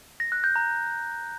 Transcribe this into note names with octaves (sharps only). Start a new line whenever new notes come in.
A#6
F#6
G6
A#5